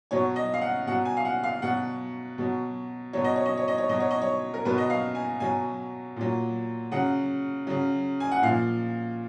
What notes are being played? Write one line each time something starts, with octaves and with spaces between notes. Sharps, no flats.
B2 F#3 C#5
D#5
F5
F#5
B2 F#3 F#5
G#5
F5
F#5
F5
B2 F#3 F#5
B2 F#3
B2 F#3 C#5
D#5
C#5
D#5
C#5
D#5
C#5
B2 F#3 D#5
C#5
D#5
C#5
A#4
B2 F#3 B4
D#5
F5
G#5
B2 F#3 G#5
A#2 F#3
C#3 F#3 F#5
C#3 F#3
G#5
F#5
A#2 F3 F5